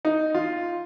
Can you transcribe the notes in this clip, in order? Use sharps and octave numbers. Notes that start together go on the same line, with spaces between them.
D#4
F4